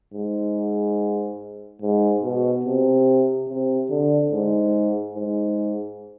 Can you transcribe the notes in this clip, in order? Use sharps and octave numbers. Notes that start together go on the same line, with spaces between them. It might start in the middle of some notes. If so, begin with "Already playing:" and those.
G#2
G#2
B2
C3
C3
D3
G#2
G#2